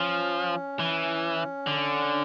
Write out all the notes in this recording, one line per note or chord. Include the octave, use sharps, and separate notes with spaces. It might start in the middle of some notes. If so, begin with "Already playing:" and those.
Already playing: F3 C#4
E3
D3